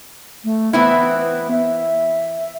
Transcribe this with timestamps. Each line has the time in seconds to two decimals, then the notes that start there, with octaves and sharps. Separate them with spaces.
0.44 A3
0.73 E3 B3 C4 E4
1.51 E5